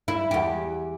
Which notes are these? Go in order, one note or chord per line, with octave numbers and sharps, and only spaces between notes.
E4
E2 G4